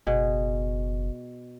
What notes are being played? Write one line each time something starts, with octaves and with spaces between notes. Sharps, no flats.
F#1 B2 G#4